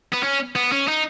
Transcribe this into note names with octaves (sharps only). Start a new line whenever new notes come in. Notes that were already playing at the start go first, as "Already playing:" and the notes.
B3
C#4
B3
C#4
D#4